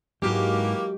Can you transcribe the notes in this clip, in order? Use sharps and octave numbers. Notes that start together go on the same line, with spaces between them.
E2 G#2 E3 F#3 G#3 A#3 F#4 G4